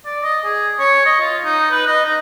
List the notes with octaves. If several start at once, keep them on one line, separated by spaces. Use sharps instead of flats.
D5
D#5
G#4
C#5
D#5
F4
D#4
B4
D#5
D#4